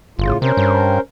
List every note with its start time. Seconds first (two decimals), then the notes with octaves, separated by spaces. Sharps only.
0.19 G1 A2 C#3 F4
0.42 C3 C#4 A#4 C5
0.57 G2